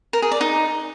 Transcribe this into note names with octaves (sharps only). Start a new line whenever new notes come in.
A#4
G#4
D5
D#4